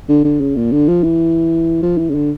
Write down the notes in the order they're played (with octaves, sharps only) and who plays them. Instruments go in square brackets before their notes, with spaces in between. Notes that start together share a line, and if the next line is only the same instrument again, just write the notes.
[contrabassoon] D3
D3
C#3
A#2
D3
F3
E3
F3
E3
C#3
D3